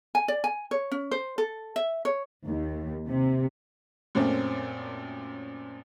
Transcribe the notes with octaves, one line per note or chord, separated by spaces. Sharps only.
G#5
D5
G#5
C#5
C#4
C5
A4
E5
C#5
D#2
C3
F#2 A#2 A3 C4 C#4